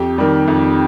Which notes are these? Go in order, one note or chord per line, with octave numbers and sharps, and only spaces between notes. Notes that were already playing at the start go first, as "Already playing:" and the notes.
Already playing: F2 G4
D#3 G3
F2